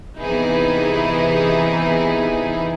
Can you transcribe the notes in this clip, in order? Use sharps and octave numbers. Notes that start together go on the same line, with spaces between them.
C3 E3 B3 D#4 E4 G#4